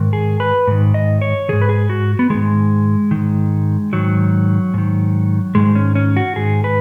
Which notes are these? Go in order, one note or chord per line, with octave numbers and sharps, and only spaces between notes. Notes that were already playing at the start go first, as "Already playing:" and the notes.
Already playing: G#2 D#3
G#4
B4
G#2 D#3
D#5
C#5
G#2 D#3 G#4
B4
G#4
F#4
B3
G#2 D#3 G#3
G#2 D#3
G#2 D#3 F#3
G#2 D#3
G#2 D#3 G#3
C#4
C#4
F#4
G#2 D#3 G#4
B4